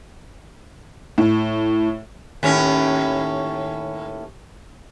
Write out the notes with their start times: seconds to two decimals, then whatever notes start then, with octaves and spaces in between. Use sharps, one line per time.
1.18 A2
2.43 D#2 A2 C#4